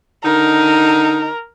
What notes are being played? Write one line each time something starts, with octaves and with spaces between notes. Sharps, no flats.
D3 D#4 A#4